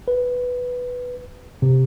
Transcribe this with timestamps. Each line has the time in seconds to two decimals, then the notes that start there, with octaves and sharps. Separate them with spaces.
0.08 B4
1.62 C3